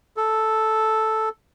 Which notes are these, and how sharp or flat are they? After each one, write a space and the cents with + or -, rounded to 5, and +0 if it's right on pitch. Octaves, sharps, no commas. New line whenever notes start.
A4 -5